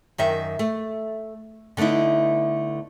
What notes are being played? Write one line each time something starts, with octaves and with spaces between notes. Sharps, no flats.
F#2 D#3 E5
A3
D3 A3 B3 D#4 E4